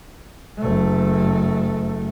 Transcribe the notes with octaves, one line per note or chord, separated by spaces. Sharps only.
F#1 A3